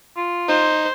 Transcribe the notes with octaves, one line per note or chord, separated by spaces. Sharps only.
F4
D#4 C5